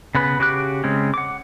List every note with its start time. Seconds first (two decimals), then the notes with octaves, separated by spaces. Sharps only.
0.15 C#3 B3 B4 B5
0.39 C#3 F#4 G4 D6 F#6
0.84 C#3 G#3 C4 C#4
1.14 F#5 D6